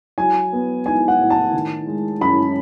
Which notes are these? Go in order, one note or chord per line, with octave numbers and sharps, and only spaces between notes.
F#3 G#5
B3
D#4 G#5
F#5
A2
A5
D#3
G#3
F#2 B5